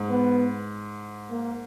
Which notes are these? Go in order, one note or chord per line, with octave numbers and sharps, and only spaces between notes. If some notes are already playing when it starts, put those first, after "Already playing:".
Already playing: G#2
B3
A#3